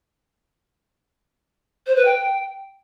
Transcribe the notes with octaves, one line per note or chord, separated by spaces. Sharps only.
C5
B4
G5